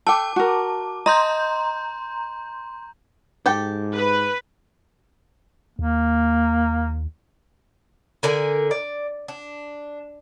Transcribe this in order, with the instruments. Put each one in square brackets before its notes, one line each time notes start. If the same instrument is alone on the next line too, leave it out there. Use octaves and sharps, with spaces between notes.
[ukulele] A4 G5 [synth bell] A5 D6
[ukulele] F#4 A#4
[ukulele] D#5 [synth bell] A#5 C6 G6
[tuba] G#2 [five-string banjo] G4 A4 G5
[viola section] B4
[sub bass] D#2 [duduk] A#3
[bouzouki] D3 A#4 D5 G#5
D5
D4